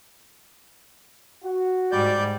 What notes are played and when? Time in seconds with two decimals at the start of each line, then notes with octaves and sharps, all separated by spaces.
1.43 F#4
1.92 G#2 G3 D5 G6